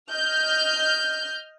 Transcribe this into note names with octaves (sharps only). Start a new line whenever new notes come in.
D#5 F6 G6